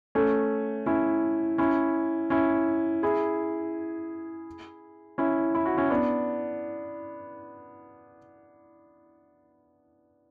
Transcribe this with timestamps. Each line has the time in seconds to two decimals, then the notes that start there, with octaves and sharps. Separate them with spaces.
0.15 A3 C#4
0.86 C#4 E4
1.58 C#4 E4
2.30 C#4 E4
3.03 E4 G#4
5.18 C#4 E4
5.55 E4
5.66 F#4
5.77 C#4 E4
5.90 B3 D4